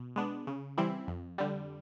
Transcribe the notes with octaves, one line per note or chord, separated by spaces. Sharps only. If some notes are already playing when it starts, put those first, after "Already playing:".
Already playing: B2
G#3 B3 D4
C#3
E3 G3 C4 E4
F2
D3 G3